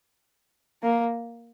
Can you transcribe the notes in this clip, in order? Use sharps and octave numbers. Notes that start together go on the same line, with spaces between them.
A#3